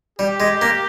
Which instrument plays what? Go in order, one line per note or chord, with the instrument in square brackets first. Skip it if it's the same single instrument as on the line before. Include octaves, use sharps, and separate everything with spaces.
[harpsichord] G3 [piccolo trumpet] G4
[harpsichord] G#3
A#3